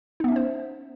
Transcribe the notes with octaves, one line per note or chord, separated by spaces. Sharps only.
B3 C#4 D#4 C5 E5